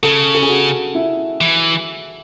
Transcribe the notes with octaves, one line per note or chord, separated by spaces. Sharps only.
C#3 A4
A4
G#4
F#4
E4
E3